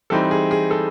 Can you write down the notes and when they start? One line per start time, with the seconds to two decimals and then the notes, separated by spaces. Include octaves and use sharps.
0.10 E3 G3 C4 D#4 A4
0.31 G#4
0.51 G#4
0.71 A4